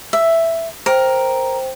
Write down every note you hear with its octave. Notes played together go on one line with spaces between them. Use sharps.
E5
A#4 C5 G5